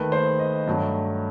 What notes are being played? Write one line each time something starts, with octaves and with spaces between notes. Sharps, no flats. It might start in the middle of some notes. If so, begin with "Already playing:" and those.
Already playing: D#2 D#3 A3 B4
C5
D#5
G2 F#3 A3